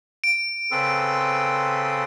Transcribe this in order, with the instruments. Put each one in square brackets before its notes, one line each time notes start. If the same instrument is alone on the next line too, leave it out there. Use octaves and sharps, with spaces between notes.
[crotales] D7
[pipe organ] C#3 A4 [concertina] C4 [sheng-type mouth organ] B4 C6 D#6